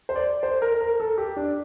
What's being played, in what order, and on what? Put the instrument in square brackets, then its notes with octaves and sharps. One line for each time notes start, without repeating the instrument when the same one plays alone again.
[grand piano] C5
D5
C5
A#4
A#4
A4
G4
D4